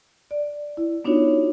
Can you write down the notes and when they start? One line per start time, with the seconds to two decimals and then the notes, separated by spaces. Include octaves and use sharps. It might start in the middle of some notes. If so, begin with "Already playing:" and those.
0.31 D5
0.77 E4
1.05 B3 D4 D#4 F4 F#4 C#5